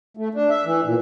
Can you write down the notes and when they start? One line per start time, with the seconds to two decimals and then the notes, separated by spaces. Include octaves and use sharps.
0.17 A3
0.34 D4
0.50 E5
0.65 E3
0.85 A#2